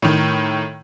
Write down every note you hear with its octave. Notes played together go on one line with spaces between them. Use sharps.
A2 D#3